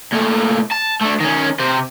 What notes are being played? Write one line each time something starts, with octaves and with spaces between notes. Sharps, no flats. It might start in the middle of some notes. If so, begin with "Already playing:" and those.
A#2 A3
A5
A3 D4
D#3 C#4
C3 C5